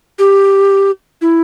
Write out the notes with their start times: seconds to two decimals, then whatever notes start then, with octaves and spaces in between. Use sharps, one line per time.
0.19 G4
1.21 E4